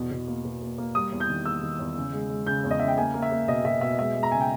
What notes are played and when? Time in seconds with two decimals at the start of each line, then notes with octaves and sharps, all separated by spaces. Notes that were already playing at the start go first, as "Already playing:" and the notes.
Already playing: E2 B2
0.11 B2
0.27 A#3
0.45 B2
0.62 A#3
0.78 A#3
0.95 G3 D#6
1.12 E2
1.20 G6
1.29 D#3
1.45 A#3 E6
1.62 D#3
1.79 E2
1.96 C#3
2.13 G#3
2.30 G#3
2.47 C#3 G6
2.64 E2
2.71 D#5
2.80 C#3 E5
2.88 G5
2.98 A#3 G#5
3.14 A#3
3.22 E5
3.31 A#3
3.48 B2 D#5
3.65 B2 E5
3.81 B2 E5
3.99 G#3 E5
4.15 G#3
4.23 A#5
4.31 C#3 G#5
4.40 G5